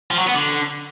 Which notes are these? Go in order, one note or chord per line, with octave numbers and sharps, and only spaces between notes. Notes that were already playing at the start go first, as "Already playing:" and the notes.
F3
F#3
B3
D3